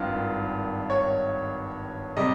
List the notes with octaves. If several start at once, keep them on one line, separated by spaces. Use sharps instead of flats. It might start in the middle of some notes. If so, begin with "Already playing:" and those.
Already playing: G#1 G2 D#3 F4
C#5
C3 G3 D#5